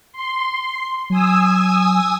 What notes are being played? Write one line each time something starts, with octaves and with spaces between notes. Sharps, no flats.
C6
F#3 G#5 D#6 E6